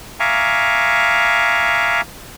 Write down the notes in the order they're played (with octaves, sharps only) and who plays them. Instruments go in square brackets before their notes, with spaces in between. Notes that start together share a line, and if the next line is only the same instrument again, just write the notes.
[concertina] E5 F5 G#5 A#5 C#6 D6